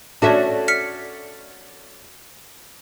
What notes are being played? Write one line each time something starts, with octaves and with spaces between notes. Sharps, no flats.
A3 C#4 D4 F#4 A4 D5 E5 A5
F6 B6 C#7